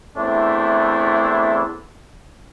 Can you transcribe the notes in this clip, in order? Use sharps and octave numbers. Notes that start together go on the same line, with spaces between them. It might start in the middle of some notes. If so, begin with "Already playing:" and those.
E2 A3 C4 D4 E4